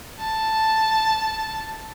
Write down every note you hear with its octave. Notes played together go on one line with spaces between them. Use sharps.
A5